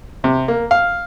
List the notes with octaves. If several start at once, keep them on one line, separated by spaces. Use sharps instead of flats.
C3
A#3
F5